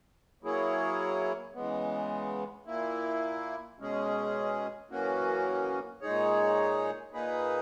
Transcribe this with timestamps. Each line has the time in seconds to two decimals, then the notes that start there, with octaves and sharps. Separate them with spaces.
0.43 F#3 A#3 E4 G#4 C#5
1.54 C#3 E3 G#3 B3
2.66 A#2 A#3 E4
3.79 B2 G#3 C#4 G#4
4.90 F#2 E3 A#3 C#4 F#4
6.01 A#2 G#3 D#4 G#4 C#5
7.13 A#2 A#3 D#4 G#4 B4